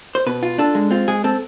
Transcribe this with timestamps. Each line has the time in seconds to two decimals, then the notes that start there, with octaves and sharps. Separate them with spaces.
0.15 C5
0.26 B2 B4
0.43 F4
0.58 D4 A4
0.75 G#3
0.91 C4 F4
1.08 G#3 G#4
1.24 C4 A4